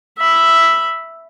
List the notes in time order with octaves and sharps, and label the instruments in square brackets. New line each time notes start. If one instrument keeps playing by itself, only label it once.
[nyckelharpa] E5 B5